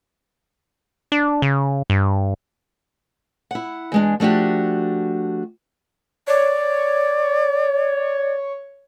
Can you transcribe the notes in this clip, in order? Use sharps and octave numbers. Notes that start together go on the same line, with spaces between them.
D4
C#3
G2
E4 F#5
E2 G#3 D4
F3 A3 D4 F#4 G4
C#5 D5